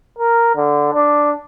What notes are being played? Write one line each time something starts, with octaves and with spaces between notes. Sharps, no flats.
A#4
D3
D4